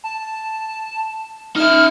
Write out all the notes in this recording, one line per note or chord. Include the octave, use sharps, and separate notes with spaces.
A5
D#4 E5 F6